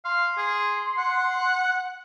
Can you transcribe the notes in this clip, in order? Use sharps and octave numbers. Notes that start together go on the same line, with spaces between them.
F5 C6
G#4
F#5